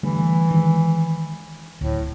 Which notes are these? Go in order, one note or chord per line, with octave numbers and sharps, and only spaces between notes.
D3 E3 G3 A3
D#3 G#3
D1 D2 A2